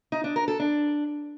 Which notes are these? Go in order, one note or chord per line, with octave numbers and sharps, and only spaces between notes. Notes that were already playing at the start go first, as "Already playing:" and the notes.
D#4
D4
A#4
A4
D4